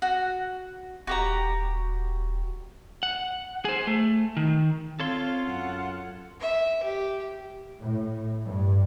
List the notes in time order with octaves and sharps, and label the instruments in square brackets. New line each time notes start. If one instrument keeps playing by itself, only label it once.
[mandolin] F#4
[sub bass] D#1 [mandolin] F#4 G4 A#5
[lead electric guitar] F#5
G#4 C5
A3
D#3
[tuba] C4 [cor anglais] F4 [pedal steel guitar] A4 C#5 C6 [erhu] F5
[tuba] F#2 [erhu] F#5
[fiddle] E5
G4
[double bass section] A2
G2